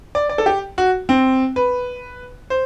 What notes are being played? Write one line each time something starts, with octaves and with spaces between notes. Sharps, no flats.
D5
D5
A4
G4
F#4
C4
B4
C5